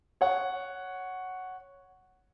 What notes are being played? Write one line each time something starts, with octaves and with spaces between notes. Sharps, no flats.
C#5 F#5